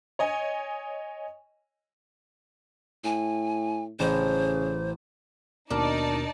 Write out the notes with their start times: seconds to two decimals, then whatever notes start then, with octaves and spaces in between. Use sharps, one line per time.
0.19 C#5 D#5 G#5
3.04 A2 G#5
3.99 A1 C#3 C5
5.71 D#2 B2 D4 D#4 A#4 D5 A5